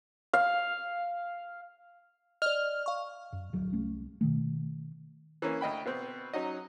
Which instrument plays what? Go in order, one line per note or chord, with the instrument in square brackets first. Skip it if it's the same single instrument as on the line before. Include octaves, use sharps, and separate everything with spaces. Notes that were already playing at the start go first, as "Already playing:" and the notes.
[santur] F5
[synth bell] D5 D#5 [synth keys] F6
[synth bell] F5 C#6
[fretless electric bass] F#2
D1 B1 F#3
C2 A3 C#4
B2 D#3 A3
[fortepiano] E3 A#3 C#4
D2 D#5 G5 B5
B2 B3 C4
F#3 C#4 D#4 F#4 D#5